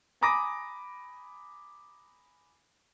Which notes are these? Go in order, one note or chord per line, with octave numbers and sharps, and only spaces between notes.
G#5 A#5 B5 D6 D#6 A#6